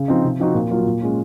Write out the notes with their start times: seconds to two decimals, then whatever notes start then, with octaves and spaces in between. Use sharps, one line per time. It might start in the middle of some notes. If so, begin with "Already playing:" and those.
Already playing: C#3
0.08 F3 C4 D#4
0.24 C3
0.39 F3 C4 D#4 F#4
0.54 A#2
0.70 F#3 A#3 F4
0.85 A#2
1.01 G#3 C#4 F4